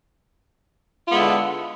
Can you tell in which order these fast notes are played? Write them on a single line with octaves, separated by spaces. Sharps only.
F4 B3 G#3 E4 D3